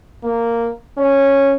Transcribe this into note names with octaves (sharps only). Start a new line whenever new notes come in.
A#3
C#4